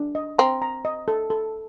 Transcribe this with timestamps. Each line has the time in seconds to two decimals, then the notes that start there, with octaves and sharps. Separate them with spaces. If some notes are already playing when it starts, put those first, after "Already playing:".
Already playing: D4
0.15 D#5
0.38 C4 A#5
0.62 A#5
0.85 D#5
1.08 A4
1.30 A4